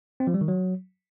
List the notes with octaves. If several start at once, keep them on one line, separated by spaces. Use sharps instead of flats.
C4
F3
G3
D#3
F#3